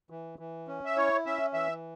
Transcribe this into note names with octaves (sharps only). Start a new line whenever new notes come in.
E3
E3
C#4
E5
E4 C#5
C#4 E5
E3 E5